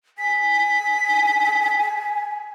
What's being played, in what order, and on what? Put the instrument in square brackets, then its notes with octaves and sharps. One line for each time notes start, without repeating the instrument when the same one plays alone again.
[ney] G#5 [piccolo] B6